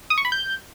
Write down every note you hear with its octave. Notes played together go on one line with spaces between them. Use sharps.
D#6
C#6
B5
G6